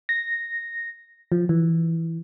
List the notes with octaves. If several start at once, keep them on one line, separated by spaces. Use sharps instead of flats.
A#6
F3
E3